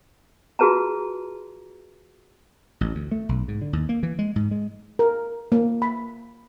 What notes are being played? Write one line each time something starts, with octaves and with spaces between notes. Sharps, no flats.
F4 F#4 G#4 B4 A5 A#5
A1
D2
A3
B1
G#2
D3
D#2
A#3
E3
G#3
G#2
G#3
A#4
A#3
B5